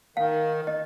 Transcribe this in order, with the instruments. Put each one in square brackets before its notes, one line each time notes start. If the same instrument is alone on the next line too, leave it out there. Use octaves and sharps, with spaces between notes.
[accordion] D#3 [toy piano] F5
[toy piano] D#5